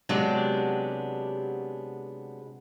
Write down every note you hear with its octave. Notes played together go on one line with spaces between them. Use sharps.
C3 F#3 G#3 B3 D4 G4